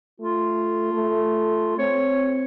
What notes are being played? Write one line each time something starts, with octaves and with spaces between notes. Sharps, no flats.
A3 F4
A3
C4 C#5